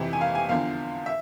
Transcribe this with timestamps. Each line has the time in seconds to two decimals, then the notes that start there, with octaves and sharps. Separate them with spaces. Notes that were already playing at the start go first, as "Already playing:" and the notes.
Already playing: F2 C3 E3
0.13 G#5
0.21 F5
0.35 G#5
0.49 E2 D3 F3 F5
1.06 E5